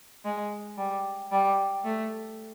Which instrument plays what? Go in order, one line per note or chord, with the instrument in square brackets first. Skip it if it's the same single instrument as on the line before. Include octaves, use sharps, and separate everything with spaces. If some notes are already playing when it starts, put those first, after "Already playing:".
[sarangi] G#3
G3
G3
A3